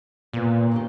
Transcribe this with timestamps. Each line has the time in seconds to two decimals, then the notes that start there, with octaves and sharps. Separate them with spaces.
0.33 A#2 A#3 B3
0.72 D#3 D4 G4